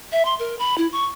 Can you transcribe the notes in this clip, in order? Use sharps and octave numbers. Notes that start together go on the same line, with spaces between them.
E5
C6
A#4
B5
E4
C#6